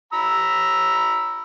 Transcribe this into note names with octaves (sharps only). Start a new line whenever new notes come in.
A#5 B5 E6